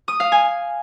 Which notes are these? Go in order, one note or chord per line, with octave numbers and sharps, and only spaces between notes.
D#6
F5
G#5